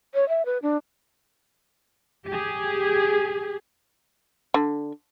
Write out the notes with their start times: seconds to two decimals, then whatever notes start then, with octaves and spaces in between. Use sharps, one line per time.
0.14 C#5
0.29 E5
0.46 B4
0.62 D4
2.27 G4 G#4
4.54 D3